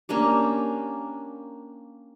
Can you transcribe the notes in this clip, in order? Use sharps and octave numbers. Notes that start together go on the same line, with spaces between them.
A#3 C#4 D4 G4